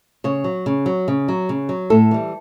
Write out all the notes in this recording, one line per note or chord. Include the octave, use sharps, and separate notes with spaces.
C#3 C#5
F#3
C#3
F#3
C#3
F#3
C#3
F#3
A2 A4
E3 G3